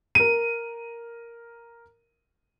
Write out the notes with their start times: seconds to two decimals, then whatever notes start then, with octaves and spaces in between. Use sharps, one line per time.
0.15 A#4 D#7